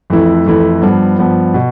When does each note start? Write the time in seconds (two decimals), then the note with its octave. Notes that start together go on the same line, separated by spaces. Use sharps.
0.10 F2 E3 A3 E4
0.46 F2 E3 A3 E4
0.82 G2 F3 B3
1.18 G2 F3 B3
1.54 B2